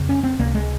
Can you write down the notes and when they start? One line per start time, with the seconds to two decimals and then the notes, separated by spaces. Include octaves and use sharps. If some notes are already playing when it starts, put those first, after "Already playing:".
Already playing: F2 C#3
0.09 C#4
0.23 C4
0.39 C#2 C3 A#3
0.55 G#3